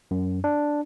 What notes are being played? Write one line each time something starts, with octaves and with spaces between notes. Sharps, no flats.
F#2
D4